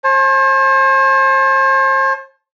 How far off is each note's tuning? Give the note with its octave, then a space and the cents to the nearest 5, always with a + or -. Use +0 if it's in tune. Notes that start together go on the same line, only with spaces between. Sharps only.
C5 +40 A5 -30